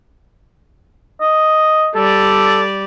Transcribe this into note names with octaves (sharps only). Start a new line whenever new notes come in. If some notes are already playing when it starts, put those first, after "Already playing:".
D#5
G3 A4 D5